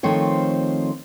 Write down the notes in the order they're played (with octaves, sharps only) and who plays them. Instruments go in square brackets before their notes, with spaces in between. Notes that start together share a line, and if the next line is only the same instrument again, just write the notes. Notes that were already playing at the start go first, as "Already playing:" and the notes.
[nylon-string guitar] D#3 F3 A3 C4 C#5